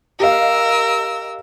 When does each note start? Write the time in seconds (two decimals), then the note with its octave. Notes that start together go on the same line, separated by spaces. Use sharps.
0.20 G4 A#4 D#5 F5 E6